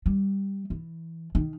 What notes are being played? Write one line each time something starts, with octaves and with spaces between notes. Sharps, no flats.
G3
E3
D#3